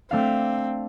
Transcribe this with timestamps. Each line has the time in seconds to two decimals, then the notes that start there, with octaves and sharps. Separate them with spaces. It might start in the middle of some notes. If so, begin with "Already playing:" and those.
0.11 A3 C4 D4 F5